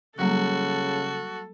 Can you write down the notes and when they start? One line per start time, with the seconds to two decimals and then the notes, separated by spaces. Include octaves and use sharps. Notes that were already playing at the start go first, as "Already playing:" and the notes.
0.19 C#3 F#3 G3 A#3 F#4 A4